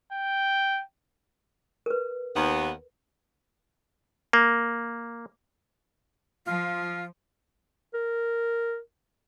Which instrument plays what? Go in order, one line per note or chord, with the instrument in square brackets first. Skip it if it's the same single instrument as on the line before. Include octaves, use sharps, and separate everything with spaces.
[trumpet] G5
[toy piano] A#4 B4
[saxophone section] D#2 B3
[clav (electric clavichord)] A#3
[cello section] F3 [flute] F4
[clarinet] A#4